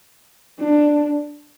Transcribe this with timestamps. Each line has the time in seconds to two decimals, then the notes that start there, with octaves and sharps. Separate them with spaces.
0.60 D4